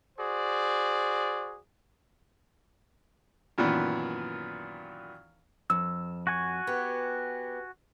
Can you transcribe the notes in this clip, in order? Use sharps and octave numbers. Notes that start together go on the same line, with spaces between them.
F#4 G#4 C5 D5
F#2 A#2 D#3 E3 B3
F2 E6
F#4 G#5 C#6
B3 G4